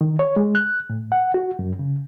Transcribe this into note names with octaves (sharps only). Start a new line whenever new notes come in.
D#3
C#5
G#3
F#6
A2
F#5
F#4
F#2
C#3